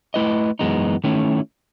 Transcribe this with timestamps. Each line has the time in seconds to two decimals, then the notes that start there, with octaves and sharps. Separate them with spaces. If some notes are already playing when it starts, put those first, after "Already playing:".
0.14 A3 E4 B4 D#5
0.59 F#2 E3 G#3 B3 D#4
1.04 D#3 A3 C#4 E4